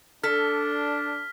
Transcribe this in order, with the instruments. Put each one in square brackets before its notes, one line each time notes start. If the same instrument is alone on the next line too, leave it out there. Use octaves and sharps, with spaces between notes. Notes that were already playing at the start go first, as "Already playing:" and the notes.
[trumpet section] D4 [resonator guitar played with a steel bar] A4 [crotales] F6 B6